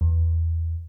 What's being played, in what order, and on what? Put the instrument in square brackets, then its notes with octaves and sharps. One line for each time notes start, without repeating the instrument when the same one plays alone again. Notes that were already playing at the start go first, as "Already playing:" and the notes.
[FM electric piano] E2